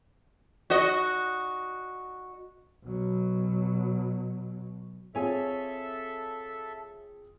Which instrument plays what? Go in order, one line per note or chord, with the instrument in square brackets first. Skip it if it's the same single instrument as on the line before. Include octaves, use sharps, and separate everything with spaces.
[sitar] F#4 D#5
[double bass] B2 F#3
[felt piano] C4 F4 G#4 [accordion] A4 E5 [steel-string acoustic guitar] C#5 G#5